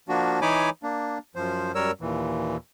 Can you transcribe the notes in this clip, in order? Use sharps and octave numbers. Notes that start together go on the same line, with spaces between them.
F3 A#3 D4 F#4
E3 D#4 C#5 G#5 B5 D6
A#3 D4
F#2 F3 C5
F#2 G3 A#4 C#5 E6
D#2 A#2 E3